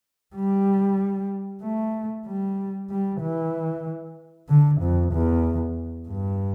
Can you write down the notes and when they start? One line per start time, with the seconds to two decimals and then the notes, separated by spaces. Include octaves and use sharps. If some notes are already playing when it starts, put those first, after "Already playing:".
0.36 G3
1.63 A3
2.26 G3
2.90 G3
3.22 E3
4.49 D3
4.81 F2
5.12 E2
6.08 G2